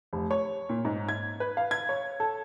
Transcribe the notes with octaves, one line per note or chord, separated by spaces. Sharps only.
F1
C#5
A#2
G#2
G#6
B4
F5
G#6
C#5
A4